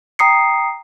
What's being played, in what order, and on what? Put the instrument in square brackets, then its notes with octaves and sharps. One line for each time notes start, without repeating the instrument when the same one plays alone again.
[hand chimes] G5 A#5 D#6 C7 C#7